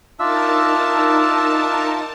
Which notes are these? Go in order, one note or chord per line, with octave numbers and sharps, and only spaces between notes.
D4 D#4 F4 A#4 E5 A5 E6